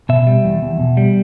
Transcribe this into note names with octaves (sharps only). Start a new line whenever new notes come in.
B2 E5
G3
E2
E2
B2
G3